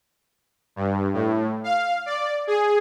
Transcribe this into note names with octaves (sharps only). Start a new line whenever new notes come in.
G2
A2
F5
D5
G#4